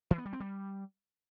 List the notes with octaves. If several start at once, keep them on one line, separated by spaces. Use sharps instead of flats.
E3
B3
G3
C4
G3